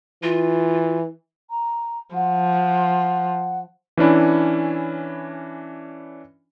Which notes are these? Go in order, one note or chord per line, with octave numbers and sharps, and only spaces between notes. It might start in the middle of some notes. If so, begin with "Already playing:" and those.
E3 F4
A#5
F3 F#5
E3 C#4 D4 E4